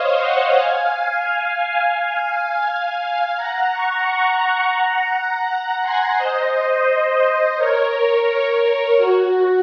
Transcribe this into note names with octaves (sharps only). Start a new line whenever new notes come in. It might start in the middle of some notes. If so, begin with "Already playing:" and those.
Already playing: C5 C#5 D#5 F5
D#5 F#5
F5 G#5
F5 G#5
F5 G#5
F#5 A#5
A#5 C#6
F#5 A#5
F#5 A#5
G#5 C6
C5 D#5
A#4 C#5
F#4